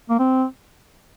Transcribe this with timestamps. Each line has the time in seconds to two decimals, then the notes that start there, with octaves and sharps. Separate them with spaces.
0.10 A#3
0.19 C4